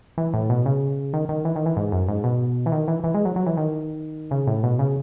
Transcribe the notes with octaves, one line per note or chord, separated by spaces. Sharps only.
E3
A2
B2
C#3
D#3
D#3
E3
D#3
E3
G#2
F#2
G#2
B2
E3
D#3
E3
E3
G#3
F#3
F#3
E3
D#3
C#3
A2
B2
C#3